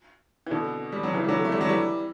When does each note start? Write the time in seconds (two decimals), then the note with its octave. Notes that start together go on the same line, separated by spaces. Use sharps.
0.47 E3
0.51 B2 D3
0.92 G3
1.03 F#3
1.13 C#3 E3
1.24 G3
1.29 D3 F#3
1.45 A3
1.52 G3
1.61 F#3
1.69 E3 G3